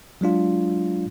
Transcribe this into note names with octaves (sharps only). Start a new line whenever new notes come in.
F#3 G#3 D4 F4